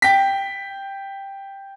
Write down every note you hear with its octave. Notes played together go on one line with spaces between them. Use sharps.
G5 B6